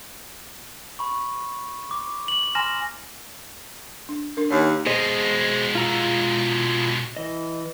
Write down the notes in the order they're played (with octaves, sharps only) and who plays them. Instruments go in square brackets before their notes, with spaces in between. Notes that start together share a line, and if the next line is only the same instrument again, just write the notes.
[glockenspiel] B5 C#6
D6
F#7
G#5 A#5 C6 F6 A#6 E7
[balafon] D4
D4 A#4
[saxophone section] D#2 [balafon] C#5
[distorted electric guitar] B2 G#3 [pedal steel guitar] G#4 C5 D#5
[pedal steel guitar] F4 A#5 E6
E3 D#5